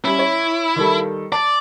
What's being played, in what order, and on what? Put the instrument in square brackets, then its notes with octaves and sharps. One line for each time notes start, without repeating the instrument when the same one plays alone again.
[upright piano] G3 C#4 [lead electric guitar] E4
[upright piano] C#5
D#3 G3 A4
[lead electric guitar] D5 [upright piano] A5